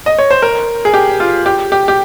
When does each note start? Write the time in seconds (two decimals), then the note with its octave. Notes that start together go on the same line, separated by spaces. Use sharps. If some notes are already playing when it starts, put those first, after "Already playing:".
0.06 D#5
0.19 C#5
0.31 C5
0.42 A#4
0.85 G#4
0.94 G4
1.20 F4
1.46 G4
1.72 G4
1.88 G4